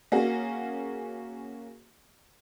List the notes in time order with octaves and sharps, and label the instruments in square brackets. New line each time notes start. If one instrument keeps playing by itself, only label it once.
[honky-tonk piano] A#3 C#4 F#4 G#4